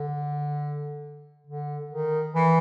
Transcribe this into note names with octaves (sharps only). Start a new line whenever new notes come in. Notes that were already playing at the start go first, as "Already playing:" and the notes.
Already playing: D3
D3
D#3
E3